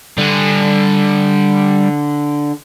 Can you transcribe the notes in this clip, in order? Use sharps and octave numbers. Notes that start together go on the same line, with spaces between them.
D3 G3 G#5